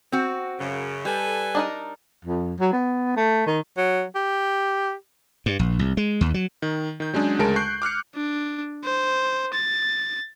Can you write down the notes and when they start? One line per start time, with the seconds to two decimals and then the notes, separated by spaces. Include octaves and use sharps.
0.12 C4 F#4
0.59 F#2 C#3
1.05 G3 A4 B4 G#5
1.55 D4 D#4 A#4
2.25 F2
2.59 F#3
2.73 B3
3.16 A3
3.46 D#3
3.77 F#3
4.15 G4
5.46 G2
5.59 A#1
5.79 C2
5.97 G#3
6.21 D#2
6.34 F#3
6.62 D#3
7.00 D#3 G6
7.14 F#3 G#3 C#4 D4 G#4
7.39 D2 C#3 G#3 A#4 A5 D7
7.56 C#6 F#6 G6 C7
7.82 D6 F6 F#6 C#7
8.15 D4
8.84 C5
9.54 A6